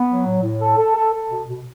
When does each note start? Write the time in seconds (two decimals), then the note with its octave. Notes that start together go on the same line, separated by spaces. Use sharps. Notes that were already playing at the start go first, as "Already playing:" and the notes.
Already playing: B3
0.09 F#3
0.26 A2
0.43 A2
0.61 A4
0.77 A4
0.96 A4
1.13 A4
1.30 B2
1.48 B2